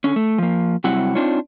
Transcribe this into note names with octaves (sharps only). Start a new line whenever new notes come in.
D3 C#4
A3
F3 A#3
C3 F#3 G3 C4 E4 F#5
C4 D4 D#4 F4 C#5